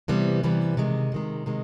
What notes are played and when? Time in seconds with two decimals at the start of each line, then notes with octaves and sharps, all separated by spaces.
0.08 C3 E3 G3 B3
0.43 C3 E3 G3 B3
0.77 C3 D#3 G#3
1.12 C3 D#3 G#3
1.46 C3 D#3 G#3